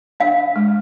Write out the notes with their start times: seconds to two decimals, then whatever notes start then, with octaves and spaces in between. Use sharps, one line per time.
0.20 D4 F5
0.56 G#3